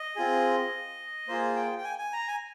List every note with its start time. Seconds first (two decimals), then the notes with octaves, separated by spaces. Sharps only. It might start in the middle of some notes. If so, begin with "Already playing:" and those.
Already playing: D#5
0.16 C4 F4 G#4
1.28 A#3 F4 G#4 C5
1.56 G5
1.78 G5
1.84 G#5
1.99 G#5
2.13 A#5
2.27 G#5